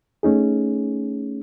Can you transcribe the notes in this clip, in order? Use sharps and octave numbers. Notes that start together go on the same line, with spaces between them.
A3 C#4 D#4 G#4